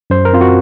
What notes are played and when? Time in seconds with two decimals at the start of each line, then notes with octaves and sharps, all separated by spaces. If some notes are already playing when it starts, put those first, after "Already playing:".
0.10 F#2 C5
0.25 A#4
0.33 C4 F4
0.41 F#4